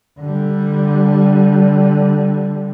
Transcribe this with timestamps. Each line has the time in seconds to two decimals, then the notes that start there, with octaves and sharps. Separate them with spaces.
0.20 D3 G3